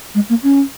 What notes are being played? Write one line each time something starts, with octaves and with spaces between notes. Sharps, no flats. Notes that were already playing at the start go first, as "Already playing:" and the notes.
G#3
A#3
C#4